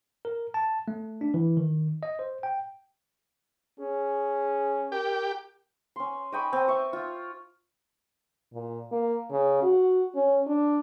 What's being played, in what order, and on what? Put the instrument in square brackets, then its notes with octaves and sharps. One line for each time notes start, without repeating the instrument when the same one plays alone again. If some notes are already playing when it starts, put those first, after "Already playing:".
[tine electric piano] A#4
A5
A3
D4
E3
D#3
D#5
C5
G5
[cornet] C#4 [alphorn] G#4
[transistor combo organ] G4 [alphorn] A#4
[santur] C#4 C6
D#5 G5 B5 C#6
C4
E5 C#6
F4
[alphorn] A#2
A#3
C#3
F#4
C#4
D4